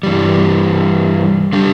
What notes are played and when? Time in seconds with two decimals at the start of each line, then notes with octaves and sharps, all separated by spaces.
0.03 G2 E3 G3
1.53 D3 G3 D4 G4